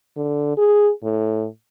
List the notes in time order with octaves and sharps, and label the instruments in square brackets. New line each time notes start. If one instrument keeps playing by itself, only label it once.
[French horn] D3
G#4
A2